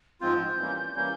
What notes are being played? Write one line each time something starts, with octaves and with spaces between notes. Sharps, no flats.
G#2 F3 G#3 C4 F4 G6
E3 G3 A#3 C#4
E3 G3 A#3 C#4 G6